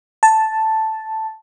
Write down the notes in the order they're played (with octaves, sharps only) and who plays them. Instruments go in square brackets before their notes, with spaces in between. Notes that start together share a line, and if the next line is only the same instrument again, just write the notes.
[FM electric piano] A5